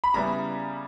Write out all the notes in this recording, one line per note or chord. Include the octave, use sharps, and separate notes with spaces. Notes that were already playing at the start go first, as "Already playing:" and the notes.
B5
C#3 G3 B3 E4 A#5